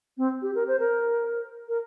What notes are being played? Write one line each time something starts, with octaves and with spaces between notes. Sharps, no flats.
C4
G4
A#4
C5
A#4
A#4